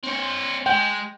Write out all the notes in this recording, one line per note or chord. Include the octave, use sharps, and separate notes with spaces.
C4 C#5
G#3 G5